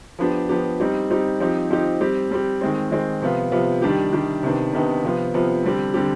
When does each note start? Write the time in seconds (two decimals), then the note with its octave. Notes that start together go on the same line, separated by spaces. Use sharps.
0.19 F3 B3 D4 G4
0.49 F3 B3 D4 G4
0.80 G3 C4 D#4 G4
1.10 G3 C4 D#4 G4
1.40 F3 C4 D#4 G4
1.70 F3 C4 D#4 G4
2.01 G3 C4 G4
2.31 G3 C4 G4
2.61 D#3 G#3 C4
2.91 D#3 G#3 C4
3.22 C3 F3 B3 F4
3.52 C3 F3 B3 F4
3.82 D#3 G3 D4 G4
4.13 D#3 G3 D4 G4
4.43 C3 D#3 B3 D4
4.73 C3 D#3 B3 D4
5.04 C3 F3 B3 F4
5.34 C3 F3 B3 F4
5.64 D3 G3 C4 G4
5.94 D3 G3 C4 G4